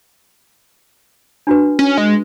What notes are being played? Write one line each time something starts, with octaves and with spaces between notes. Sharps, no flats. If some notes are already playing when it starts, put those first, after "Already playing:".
D4 F#4 B4
C#4
G#3